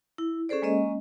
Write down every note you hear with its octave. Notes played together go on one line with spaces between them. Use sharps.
E4
C#4 G#4 A4 C5 D5
G#3 A#3 C#4 D#5